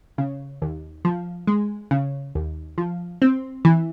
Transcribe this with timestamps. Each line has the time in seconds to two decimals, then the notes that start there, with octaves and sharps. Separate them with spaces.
0.18 C#3
0.62 D#2
1.05 F3
1.47 G#3
1.91 C#3
2.35 D#2
2.78 F3
3.22 C4
3.65 E3